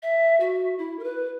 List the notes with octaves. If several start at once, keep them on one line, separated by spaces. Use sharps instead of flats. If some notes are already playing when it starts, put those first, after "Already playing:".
E5
F#4
E4
A#4
B4